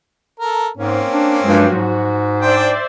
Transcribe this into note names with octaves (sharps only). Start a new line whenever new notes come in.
A4 A#4
G#2 A#3 C4 C#4
D4
G2 F3 F#3 G#3
G#2 F#4
D4 C5 D5 E5 G5